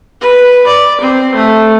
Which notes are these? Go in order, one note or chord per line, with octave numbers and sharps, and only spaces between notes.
B4
D5
C4
A3